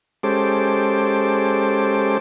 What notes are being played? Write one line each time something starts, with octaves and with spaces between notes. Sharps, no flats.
G#3 C#4 G4 A4 C5 D6